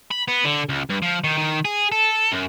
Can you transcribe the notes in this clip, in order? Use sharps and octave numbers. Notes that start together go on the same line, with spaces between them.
B5
B3
D3
C#2
G2
F3
D#3
D#3
G#4
A4
F#2